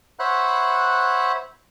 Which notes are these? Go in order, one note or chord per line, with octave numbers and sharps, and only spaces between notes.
C5 C#5 E5 F#5 B5 F#6